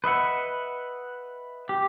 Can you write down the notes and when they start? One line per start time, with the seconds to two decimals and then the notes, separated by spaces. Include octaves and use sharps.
0.04 B4 D#5 E5 F#5
1.69 G4